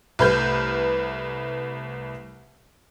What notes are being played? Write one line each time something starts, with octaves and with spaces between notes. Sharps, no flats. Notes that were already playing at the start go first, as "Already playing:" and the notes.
C2 A3 B4 F6 G6